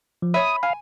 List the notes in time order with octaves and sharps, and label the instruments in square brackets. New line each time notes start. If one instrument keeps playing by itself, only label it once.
[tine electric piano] F3
[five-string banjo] C#5 E5 [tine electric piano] B5 [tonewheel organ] D#6
[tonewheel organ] F5 [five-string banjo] G#5